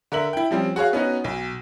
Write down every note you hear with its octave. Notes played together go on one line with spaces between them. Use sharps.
D3 A#4 E5 F#7
E4 G5
F3 G3 C4 C#4
F#4 G#4 C#5 F5
B3 C#4 D#4 F#4
B1